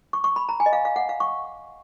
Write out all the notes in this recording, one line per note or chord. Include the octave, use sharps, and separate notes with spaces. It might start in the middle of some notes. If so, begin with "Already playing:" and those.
C#6
C#6
B5
A#5
G#5
D#5
F5
F5
F#5
F5
C#6